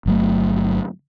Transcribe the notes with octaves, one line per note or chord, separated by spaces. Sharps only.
G1 F#3 A3